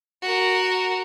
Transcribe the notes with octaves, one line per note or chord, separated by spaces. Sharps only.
F#4 A#4